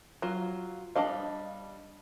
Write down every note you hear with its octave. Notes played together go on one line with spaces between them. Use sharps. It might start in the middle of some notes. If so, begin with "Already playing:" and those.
F#3 F4
G3 D4 G#4 D#5 F5